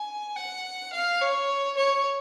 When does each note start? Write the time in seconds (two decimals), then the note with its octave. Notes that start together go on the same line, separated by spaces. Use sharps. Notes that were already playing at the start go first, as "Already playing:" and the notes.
Already playing: G#5
0.36 F#5
0.93 F5
1.21 C#5
1.77 C#5